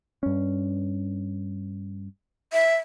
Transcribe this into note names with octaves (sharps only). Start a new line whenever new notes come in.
G2 C#4
E5